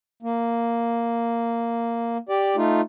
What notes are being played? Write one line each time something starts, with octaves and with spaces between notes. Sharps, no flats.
A#3
G4 D5
A3 D#4 F4